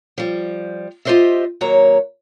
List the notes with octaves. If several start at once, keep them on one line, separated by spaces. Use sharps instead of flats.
F3 G3
F4 G4 G#4 C5 D#5 E5
D#2 F#3 A#3 C#5 A#5